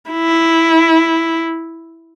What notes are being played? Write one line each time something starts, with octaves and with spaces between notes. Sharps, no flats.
E4